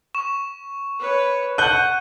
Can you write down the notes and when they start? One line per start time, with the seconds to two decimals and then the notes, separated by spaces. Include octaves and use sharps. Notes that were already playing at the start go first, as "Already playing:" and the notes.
0.15 C#6 E7
0.99 B4 C#5
1.58 F#5 F#6 G6 D#7